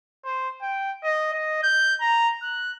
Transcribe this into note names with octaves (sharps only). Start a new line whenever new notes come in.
C5
G5
D#5
D#5
G6
A#5
F#6